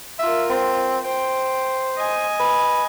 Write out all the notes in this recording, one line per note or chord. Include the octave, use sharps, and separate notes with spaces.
F4 A#4 E5
C4
C5 G5
D#5 G#5
B4